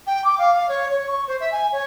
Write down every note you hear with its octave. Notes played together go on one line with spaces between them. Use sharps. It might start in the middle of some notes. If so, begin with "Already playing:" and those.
G5
D6
F5
F5
C#5
C#5
C#6
C5
E5
G#5
C#5